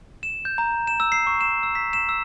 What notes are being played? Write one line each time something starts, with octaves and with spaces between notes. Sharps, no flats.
E7
G6
A#5
E7
E6
C7
C#6
E7
E6
B6
E7
E6